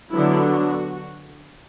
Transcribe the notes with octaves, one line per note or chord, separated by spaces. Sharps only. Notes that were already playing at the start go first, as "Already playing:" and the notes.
D3 F#3 B3 D4 E4
F#4